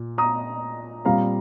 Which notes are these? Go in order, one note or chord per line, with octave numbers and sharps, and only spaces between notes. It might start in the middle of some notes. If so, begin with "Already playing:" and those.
Already playing: A#2
A#5 D#6
A#2 G3 C4 F5 A#5